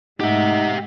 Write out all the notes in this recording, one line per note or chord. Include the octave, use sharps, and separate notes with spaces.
G#2 G#3 A3 D#4 G4 E5 F#5